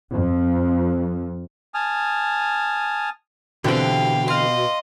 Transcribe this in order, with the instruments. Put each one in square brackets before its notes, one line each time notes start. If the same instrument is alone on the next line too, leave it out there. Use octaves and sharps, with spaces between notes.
[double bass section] F2
[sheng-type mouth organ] G#5 A5 D#6 F6
[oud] B2 [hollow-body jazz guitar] D3 E3 C4 [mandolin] G4 B4 [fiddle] F5 G5
[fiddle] D#5 [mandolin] F5 C6